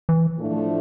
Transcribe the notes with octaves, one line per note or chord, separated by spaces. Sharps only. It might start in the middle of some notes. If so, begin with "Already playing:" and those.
E3
A2 F3 A3 D4